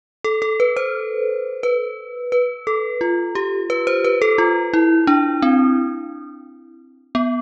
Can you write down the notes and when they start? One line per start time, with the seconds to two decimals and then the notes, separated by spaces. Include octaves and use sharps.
0.24 A4
0.42 A4
0.60 B4
0.77 C5
1.63 B4
2.32 B4
2.67 A4
3.01 F4
3.35 G4
3.70 B4
3.87 C5
4.04 B4
4.22 A4
4.38 F4
4.74 E4
5.07 D4
5.42 C4
7.15 B3